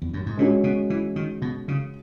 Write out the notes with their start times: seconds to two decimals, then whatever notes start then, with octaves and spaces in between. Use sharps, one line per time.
0.02 E2
0.13 F#2
0.26 G#2
0.37 A#2 G#3 C#4 F#4
0.64 B2
0.90 E3
1.16 D#3
1.42 B2
1.68 C#3